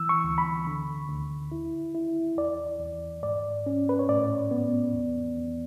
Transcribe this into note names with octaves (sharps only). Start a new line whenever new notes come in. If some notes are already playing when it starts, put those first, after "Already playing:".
Already playing: E3 E6
C#6
D2
B5
D3
D2
E4
E4
E2 D5
E2
G#2 D5
C#4
B4
C#5
A2 D5
B3
E2
E2